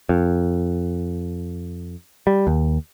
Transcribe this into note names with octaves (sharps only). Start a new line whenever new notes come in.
F2
G3
D#2